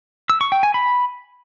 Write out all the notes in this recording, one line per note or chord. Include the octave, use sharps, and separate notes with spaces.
E6
C#6
G5
G#5
B5